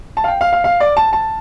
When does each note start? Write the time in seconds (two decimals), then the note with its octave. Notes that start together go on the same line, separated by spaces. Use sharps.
0.17 A5
0.24 F5
0.28 G5
0.41 F5
0.53 F5
0.64 F5
0.80 D5
0.97 A5
1.13 A5